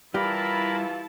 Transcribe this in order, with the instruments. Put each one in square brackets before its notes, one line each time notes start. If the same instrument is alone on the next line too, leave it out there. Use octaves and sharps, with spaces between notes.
[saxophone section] E3 F4 [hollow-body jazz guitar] G3 G4 [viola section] E4 A5 [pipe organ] A#4 B5